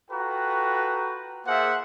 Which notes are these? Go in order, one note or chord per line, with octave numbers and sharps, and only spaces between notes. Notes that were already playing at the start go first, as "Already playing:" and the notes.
F4 F#4 A4 B4 G5 A#5
A#3 F4 G#4 C5 E5 F#5